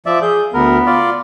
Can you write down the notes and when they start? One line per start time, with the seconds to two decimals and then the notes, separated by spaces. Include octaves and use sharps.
0.06 F3 D5 E5
0.22 G#4 G6
0.54 D2 B3 A#4
0.86 F4 D5